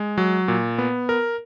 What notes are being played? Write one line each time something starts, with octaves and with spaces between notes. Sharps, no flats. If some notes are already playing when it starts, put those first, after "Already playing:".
Already playing: G#3
F#3
A#2
B3
A#4